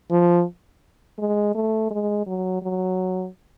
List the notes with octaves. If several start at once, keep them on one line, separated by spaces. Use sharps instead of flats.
F3
G#3
A3
G#3
F#3
F#3